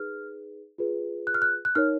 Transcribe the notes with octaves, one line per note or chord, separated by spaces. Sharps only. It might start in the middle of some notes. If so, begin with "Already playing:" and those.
Already playing: D#4 G#4 B4 F6
F4 G#4 B4
F#6
F6
F#6
F#6
D#4 A#4 C#5 F6